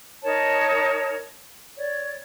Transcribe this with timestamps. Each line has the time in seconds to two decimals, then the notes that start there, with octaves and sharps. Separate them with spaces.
0.23 D#4 A#4 C#5 A5
1.76 C#5 D5